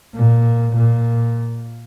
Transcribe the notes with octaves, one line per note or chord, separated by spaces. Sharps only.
A#2
A#2